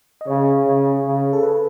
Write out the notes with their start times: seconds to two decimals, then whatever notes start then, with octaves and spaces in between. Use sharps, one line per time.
0.21 D#5
0.27 C#3 C#5
0.66 C#3
1.05 C#3
1.33 A4
1.43 B4